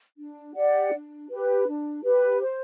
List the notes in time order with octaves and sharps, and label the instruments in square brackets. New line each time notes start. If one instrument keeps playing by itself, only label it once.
[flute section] D4
G4 D5 F#5
D4
G4 B4
D4
G4 B4
C5